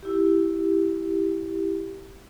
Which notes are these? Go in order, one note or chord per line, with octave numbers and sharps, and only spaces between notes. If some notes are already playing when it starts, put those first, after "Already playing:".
E4 G4